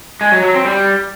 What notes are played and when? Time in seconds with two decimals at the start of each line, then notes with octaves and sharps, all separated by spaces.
0.21 G#3
0.32 F#3
0.43 F#3
0.54 C4
0.65 G3